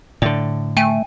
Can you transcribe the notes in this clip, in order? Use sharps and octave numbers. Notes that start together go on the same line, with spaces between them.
A2 D3 D5
A3 G5 G#5 D#7